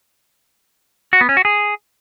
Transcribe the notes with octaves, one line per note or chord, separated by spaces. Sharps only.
F#4
B3
C#4
F#4
G#4